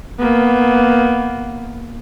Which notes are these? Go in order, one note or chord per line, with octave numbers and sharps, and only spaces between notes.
A#3 B3